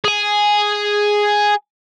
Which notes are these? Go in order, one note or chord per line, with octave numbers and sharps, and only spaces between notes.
G#4 G#5